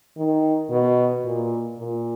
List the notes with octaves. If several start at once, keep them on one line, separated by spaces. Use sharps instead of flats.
D#3
B2
A#2
A#2